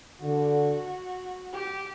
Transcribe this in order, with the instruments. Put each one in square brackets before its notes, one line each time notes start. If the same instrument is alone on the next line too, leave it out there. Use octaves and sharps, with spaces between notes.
[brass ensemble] D3 [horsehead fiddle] F#4
[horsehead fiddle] G4